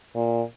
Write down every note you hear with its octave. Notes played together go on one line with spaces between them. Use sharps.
A#2